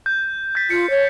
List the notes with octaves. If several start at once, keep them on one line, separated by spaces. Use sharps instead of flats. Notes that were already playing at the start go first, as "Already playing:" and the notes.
G6
G6 A6 B6
F4 C#7
C#5